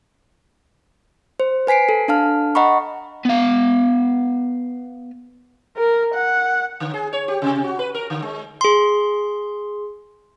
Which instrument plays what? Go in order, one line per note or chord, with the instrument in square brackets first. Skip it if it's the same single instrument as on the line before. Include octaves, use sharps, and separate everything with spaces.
[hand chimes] C5
B4 G#5 B6 C7 D7
A4
D4 A4 F5 A5 F6
D#5 F#5 A#5 B5 C#6
[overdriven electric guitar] B3 F5
[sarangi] A#4
F#5
[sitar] D3
G#4
C#5
G4
C3
F#4
B4
A#4
D3
G#3
[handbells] G#4 C6